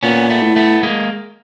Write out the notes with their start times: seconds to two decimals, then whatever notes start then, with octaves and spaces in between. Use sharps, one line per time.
0.03 A#2 B3 C#4
0.30 A3 B3
0.43 A2
0.56 A3 B3
0.83 G#3 A#3